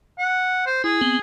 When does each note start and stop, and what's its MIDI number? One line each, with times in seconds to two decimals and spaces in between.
0.19 0.64 78
0.66 0.82 72
0.84 1.01 64
0.84 1.20 68
1.01 1.19 59
1.01 1.19 60